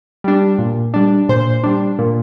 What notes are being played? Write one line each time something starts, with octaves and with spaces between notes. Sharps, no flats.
G3 D4
A#2
G3 D4
A#2 C5
G3 D4
A#2